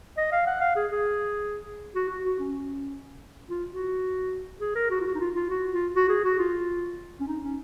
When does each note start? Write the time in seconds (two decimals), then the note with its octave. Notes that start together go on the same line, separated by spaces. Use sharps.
0.17 D#5
0.32 F5
0.46 F#5
0.61 F5
0.76 G#4
0.91 G#4
1.95 F#4
2.09 F#4
2.25 F#4
2.40 C#4
3.50 F4
3.72 F#4
4.61 G#4
4.76 A#4
4.91 F#4
5.01 F4
5.06 F#4
5.15 D#4
5.20 F4
5.35 F4
5.50 F#4
5.72 F4
5.95 F#4
6.09 G#4
6.24 F#4
6.39 F4
7.20 C#4
7.27 D#4
7.43 C#4